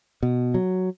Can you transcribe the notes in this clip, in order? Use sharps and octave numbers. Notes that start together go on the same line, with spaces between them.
B2
F#3